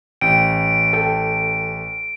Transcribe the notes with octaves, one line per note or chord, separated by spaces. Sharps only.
A1 G5 D7
A4 G5